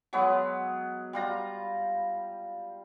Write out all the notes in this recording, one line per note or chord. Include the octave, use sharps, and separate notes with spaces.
F#3 G#3 B3
G3 F4 A#5